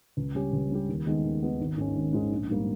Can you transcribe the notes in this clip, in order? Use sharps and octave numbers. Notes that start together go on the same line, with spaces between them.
C#2
C#3 G3 C#4 G4
C#2
C#3 G3 C#4 G4
D#2
D#3 G#3 B3
D#2
D#3 G#3 B3
G#1
G#2 D#3 G#3 C#4
G#1
G#2 D#3 G#3 C#4
A#1
G#2 G3 A#3